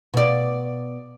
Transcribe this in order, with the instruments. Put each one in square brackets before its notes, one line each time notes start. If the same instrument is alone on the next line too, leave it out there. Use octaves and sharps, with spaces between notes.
[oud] B2 D5